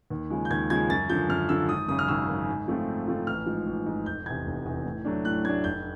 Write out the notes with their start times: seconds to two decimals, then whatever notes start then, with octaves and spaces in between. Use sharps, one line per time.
0.10 D#2
0.30 C#3 F3 G#3
0.45 G6
0.50 D#2 G#6
0.70 C#3 F3 G#3 G#6
0.89 F#2 A6
1.09 D3 F3 G6
1.29 F#2 F6
1.49 D3 F3 E6
1.69 G#1 D#6
1.88 F#2 C#3 D#6
1.99 F6
2.08 G#1 E6
2.28 F#2 C#3
2.48 G#2
2.68 F3 A3 C4 F4
2.88 G#2
3.07 F3 A3 C4 F4
3.27 A1 F6
3.46 G#2 F3
3.66 A1
3.86 G#2 F3
4.06 F1 G6
4.26 E2 C3 G#6
4.46 F1
4.66 E2 C3
4.85 A2
5.05 F#3 A3 D4
5.25 A2 F#6
5.44 F#3 A3 D4 G#6
5.64 F1 G6